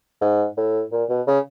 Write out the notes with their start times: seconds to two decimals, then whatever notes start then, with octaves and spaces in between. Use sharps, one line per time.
0.21 G#2
0.57 A2
0.92 A#2
1.09 B2
1.27 C#3